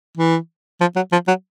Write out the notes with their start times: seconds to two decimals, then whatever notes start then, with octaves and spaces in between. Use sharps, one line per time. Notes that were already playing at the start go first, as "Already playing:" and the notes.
0.17 E3
0.81 F3
0.96 F#3
1.12 F3
1.28 F#3